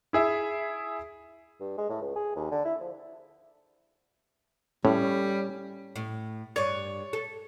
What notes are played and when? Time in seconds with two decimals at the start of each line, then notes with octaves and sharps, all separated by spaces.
0.13 E4 G#4 E5
1.61 G2
1.78 G#3
1.90 A2
2.02 C#2
2.16 G#4
2.36 D#2
2.51 D3
2.65 E4
2.81 F3
4.85 A2 G3 C#4
5.96 A2
6.56 G2 C#5 D5
7.13 A4